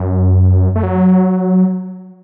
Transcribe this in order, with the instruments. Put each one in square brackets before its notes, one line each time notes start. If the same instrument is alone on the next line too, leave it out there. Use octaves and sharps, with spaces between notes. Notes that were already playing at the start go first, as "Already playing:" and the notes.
Already playing: [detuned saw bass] F#2
A3
F#3